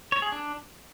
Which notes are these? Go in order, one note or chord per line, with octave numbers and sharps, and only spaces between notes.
C#5
G#4
D4